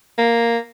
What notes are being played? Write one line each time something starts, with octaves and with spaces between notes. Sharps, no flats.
A#3